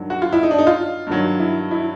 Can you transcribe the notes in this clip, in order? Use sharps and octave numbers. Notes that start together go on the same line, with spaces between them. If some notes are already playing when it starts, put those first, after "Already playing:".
Already playing: G2 D#3 F#3
F#4
F4
E4
D#4
D4
D#4
F4
G2 D#3 F#3
E4
E4